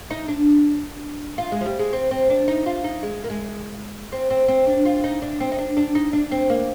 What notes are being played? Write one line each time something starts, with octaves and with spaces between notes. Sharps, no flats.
D#4
D4
F4
G#3
F3
G3
G#3
C4
C4
D4
D#4
F4
D#4
G#3
A#3
G#3
C4
C4
C4
D4
F4
D#4
D4
C4
D#4
D4
D4
D#4
D4
C4
A#3